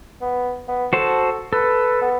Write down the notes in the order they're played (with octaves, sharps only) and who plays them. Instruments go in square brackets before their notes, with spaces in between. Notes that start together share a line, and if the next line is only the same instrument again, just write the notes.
[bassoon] B3
B3
[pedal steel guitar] F#4 C5 A5 [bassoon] A4
[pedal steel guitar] A4 [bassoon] B4
[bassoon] B3